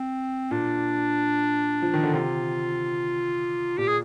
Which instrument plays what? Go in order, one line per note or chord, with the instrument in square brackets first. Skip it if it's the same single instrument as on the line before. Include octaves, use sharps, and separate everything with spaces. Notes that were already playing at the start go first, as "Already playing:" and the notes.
Already playing: [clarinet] C4
[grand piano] A#2 [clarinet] D4
[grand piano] F3
D#3
D3
[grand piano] C3 [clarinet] F4
[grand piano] A#2 [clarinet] G4
[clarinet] G#4